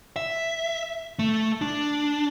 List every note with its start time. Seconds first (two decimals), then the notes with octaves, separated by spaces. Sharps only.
0.16 E5
1.19 A3
1.61 D4